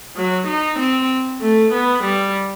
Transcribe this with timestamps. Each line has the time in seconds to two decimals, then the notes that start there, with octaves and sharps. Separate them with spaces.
0.16 F#3
0.47 D#4
0.79 C4
1.41 A3
1.73 B3
2.04 G3